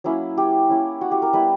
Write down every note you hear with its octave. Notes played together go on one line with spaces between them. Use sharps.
F#3 A#3 C#4 E4
G4
A#3 C#4 E4
F#4
G4
A#4
G3 B3 E4 B4